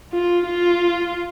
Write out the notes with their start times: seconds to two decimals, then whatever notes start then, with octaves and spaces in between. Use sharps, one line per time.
0.13 F4
0.46 F4